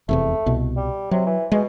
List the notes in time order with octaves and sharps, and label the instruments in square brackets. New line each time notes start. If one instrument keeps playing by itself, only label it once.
[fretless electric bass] F1 E2 C3 [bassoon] A3
[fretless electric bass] C2 B2
[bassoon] G3
[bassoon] C3 [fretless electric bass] F#3
[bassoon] E3
[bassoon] B2 [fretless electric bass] G#3